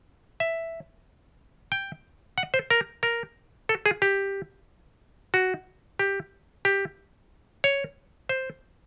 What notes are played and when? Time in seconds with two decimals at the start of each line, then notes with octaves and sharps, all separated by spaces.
0.40 E5
1.72 G5
2.38 F#5
2.54 C5
2.70 A#4
3.03 A#4
3.69 A4
3.86 G#4
4.02 G4
5.34 F#4
5.99 G4
6.65 G4
7.64 C#5
8.29 C5